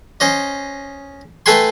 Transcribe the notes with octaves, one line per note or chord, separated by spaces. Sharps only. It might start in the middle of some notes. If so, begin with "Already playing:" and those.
C#4 C5 D#5
A3 A4 B4 G5 G#5 C6